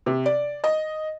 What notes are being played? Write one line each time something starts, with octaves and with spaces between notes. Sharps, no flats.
C3
D5
D#5